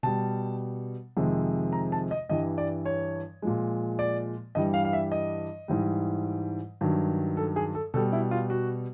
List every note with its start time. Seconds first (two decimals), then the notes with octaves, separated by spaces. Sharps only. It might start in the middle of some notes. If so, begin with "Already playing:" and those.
0.03 B2 G3 A5
1.17 F2 C3 D#3 G#3
1.73 A#5
1.92 A5
2.11 D#5
2.29 G2 E3 G3 D#5
2.58 D5
2.85 C#5
3.42 A#2 F3 G#3
3.99 D5
4.55 G2 E3 G3 D#5
4.74 F5
4.85 F5
4.93 E5
5.12 D#5
5.68 G#2 E3 G3
6.81 G2 D#3 F#3
7.37 A4
7.56 G#4
7.75 A4
7.94 B2 G3 A4
8.12 E4
8.31 F4
8.50 F#4